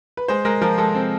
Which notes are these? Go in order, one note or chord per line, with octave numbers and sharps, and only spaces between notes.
B4
G#3 C5
G#3 A#4
F3 A#4
G#3 A4
C4